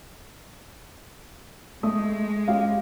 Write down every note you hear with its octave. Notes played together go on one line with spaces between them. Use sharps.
G#3 A3 D#6
C#4 G4 F5